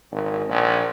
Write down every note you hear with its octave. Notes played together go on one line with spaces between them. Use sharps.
G#1
A#1